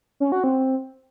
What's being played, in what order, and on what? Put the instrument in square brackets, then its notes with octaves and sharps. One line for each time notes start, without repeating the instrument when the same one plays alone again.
[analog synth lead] C#4
F#4
C4